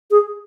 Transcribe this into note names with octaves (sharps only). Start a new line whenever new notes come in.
G#4